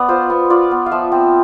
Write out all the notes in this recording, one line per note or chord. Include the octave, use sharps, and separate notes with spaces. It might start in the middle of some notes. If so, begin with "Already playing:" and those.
Already playing: B3 D5
F4 C5
B3
F4 D5
B3
F5
F3 E5
C4